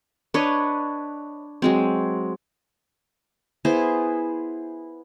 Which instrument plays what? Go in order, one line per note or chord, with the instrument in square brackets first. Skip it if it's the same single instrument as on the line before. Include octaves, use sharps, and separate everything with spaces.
[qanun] D4 B4 C#5 D#5
F#3 G#3 C4
B3 E4 G#4 C5